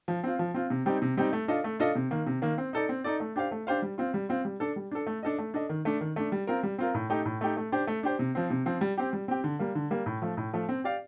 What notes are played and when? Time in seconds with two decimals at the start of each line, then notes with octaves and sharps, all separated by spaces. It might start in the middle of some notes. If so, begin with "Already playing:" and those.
0.08 F3
0.24 C4 F4
0.39 F3
0.54 C4 F4
0.70 C3
0.86 G3 C4 D#4 G4
1.02 C3
1.17 G3 C4 D#4 G4
1.33 A3
1.48 D4 F4 A4 D#5
1.64 A3
1.80 D4 F4 A4 D#5
1.95 C3
2.11 D#3 A#3
2.26 C3
2.42 D#3 A#3
2.58 C4
2.73 D#4 A4 D5
2.89 C4
3.04 D#4 A4 D5
3.20 A3
3.36 D4 G4 C5 F5
3.51 A3
3.67 D4 G4 C5 F5
3.82 G3
3.98 C4 F4
4.14 G3
4.29 C4 F4
4.45 G3
4.60 D4 A4
4.76 G3
4.91 D4 A4
5.07 A3
5.23 D4 A4 D#5
5.38 A3
5.54 D4 A4 D#5
5.69 D#3
5.85 A3 D4
6.01 D#3
6.16 A3 D4
6.32 G3
6.47 C4 F4 A#4
6.63 G3
6.79 C4 F4 A#4
6.94 A2
7.10 A3 D#4 G4
7.25 A2
7.41 A3 D#4 G4
7.57 A3
7.72 D4 G4 C5
7.87 A3
8.03 D4 G4 C5
8.19 C3
8.35 F3 C4
8.50 C3
8.66 F3 C4
8.81 G3
8.98 C4 G4
9.13 G3
9.28 C4 G4
9.44 D3
9.59 G3 A#3
9.75 D3
9.91 G3 A#3
10.06 A2
10.22 F3 A3
10.37 A2
10.53 F3 A3
10.69 C4
10.84 G4 D5 F5